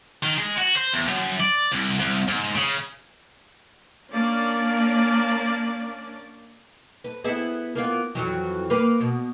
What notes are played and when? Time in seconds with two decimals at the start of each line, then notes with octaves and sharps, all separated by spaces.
0.23 D#3
0.38 G#3
0.57 F#4
0.76 C5
0.93 E2
1.07 F#2
1.40 D5
1.72 C2
2.00 C2
2.28 G#2
2.55 C#3
4.11 A#3 C#4 D4 D5
7.04 B4
7.24 B3 E4 G#4
7.75 A#3 B3 F4
8.15 F2 E3 F#3
8.70 A#3 B4
9.01 B2